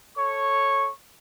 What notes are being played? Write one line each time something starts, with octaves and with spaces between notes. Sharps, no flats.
A4 C#5 C#6